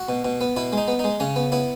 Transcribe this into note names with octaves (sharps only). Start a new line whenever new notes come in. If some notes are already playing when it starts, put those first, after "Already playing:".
Already playing: F#4
B2
B2
B3
B2 E4
G#3 D#4
B3
G#3 D#4
C#3 C#4
B3
B3 E4